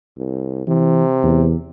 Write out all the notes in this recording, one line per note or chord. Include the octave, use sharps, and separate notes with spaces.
C2
C3 E3
E2